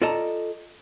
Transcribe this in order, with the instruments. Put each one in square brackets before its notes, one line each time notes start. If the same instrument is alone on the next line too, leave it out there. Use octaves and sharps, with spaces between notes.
[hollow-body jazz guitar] F4 A4 D5 D#5 A5 A#5